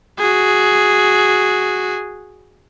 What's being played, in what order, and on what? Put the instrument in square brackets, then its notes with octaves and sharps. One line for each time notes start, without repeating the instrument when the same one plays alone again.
[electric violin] F#4 G#4